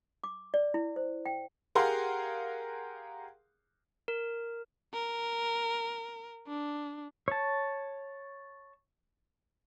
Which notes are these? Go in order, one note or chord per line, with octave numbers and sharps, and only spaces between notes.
D6
D5
E4
C5
G5
G4 G#4 A#4 F5 F#5 C6
A#4
A#4
D4
C#5 A5